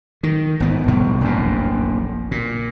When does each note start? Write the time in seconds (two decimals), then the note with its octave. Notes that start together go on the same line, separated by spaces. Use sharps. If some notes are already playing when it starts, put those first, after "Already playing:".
0.23 D#3
0.60 G#1 B3
0.88 A1 B2 G3 B3
1.21 F1 A#1 F#2 A2
2.31 A#2